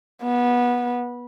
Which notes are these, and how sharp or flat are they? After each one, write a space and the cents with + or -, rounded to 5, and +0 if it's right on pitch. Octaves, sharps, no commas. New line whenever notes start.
B3 -20